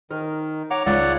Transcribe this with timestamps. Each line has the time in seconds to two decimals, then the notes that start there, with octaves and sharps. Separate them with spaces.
0.10 D#3 D#4 A#4
0.71 C#5 F#5 A#5 D6
0.86 C#2 C#5 D5 F#5